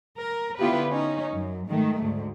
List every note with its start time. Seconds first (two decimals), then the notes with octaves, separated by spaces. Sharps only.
0.18 A#4
0.58 D3 B3 E4 F4 G4 B4
0.89 C#4 D#4
1.32 F#2
1.68 G#2 D#3 A3
2.00 D2 G#2